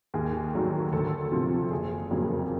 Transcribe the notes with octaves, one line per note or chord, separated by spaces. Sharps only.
D#2 G#4
D#3 F#3 A3
D2 A4
C3 F3
F#1 G#4
F2 C#3 F#3 A#3